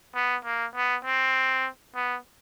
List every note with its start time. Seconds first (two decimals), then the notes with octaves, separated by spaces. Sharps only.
0.15 B3
0.45 A#3
0.75 B3
1.05 C4
1.95 B3